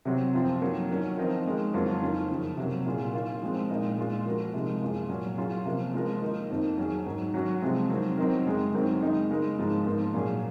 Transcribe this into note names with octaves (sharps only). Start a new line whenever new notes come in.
C3 F#3 C4
F#2 F3 C4 F4
D#3 F#3 A#3
D#3 F#3 C#4
F3 C4 D#4 A#4
D#3 G#3 C#4
F2 C#3 F#3 A#3 F4
D#3 A#3 C#4 F4
F#2 C#3 F3
C3 F#3 A#3
A#2 F#3 C#4 F4 G#4
D#3 A#3 C#4 F4
F3 G#3 C4
A#2 G#3 D#4 A#4
A#2 G#3 C#4 F4
F3 A#3 C#4 F#4 A#4
C3 F3 G#3 D#4
F#2 F3 A#3 F4 G#4
A#2 F#3 C#4
F#3 C#4 F4 G#4
C3 F3 A#3 C#4
F3 G#3 C#4 F4 A#4
D#3 A#3 D#4 A#4
F2 D#3 A#3 D#4
F#3 C#4 G#4
G#2 D#3 F#3
F#3 C#4 F#4
C3 F3 G#3 C4
D#3 F#3 C4
F#3 C4 D#4 A#4
F#2 C#3 G#3
F#2 D#3 F#3 C4
C#3 G#3 D#4
C#3 G#3 D#4 A#4
G#2 F3 G#3
G#2 F3 A#3 F4 A#4
A#2 F#3 C#4 G#4